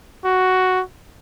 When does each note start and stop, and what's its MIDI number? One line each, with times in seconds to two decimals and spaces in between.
0.25 0.82 66